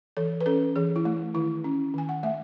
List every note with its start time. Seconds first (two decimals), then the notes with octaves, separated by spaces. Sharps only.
0.17 E3 A4
0.41 B4
0.46 C#4 A4
0.76 E3 G#4
0.96 E4
1.05 A3
1.34 D#3 E4
1.64 C#4
1.94 D#3 G#5
2.09 F#5
2.23 A3 E5